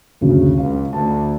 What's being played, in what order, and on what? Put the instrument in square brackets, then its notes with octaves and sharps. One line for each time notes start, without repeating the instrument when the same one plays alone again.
[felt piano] F#1 D2 F#3 [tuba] C#3
[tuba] C#2 [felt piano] F5
[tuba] D2 [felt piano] A5